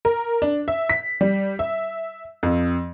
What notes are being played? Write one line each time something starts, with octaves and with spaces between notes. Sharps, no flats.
A#4
D4
E5
B6
G3
E5
F2